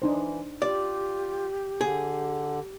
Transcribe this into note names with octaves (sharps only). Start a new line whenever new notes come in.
E3 D4 D#4 C5
F4 G4 D5
D3 G#4